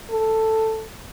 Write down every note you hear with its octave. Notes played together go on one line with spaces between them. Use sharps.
A4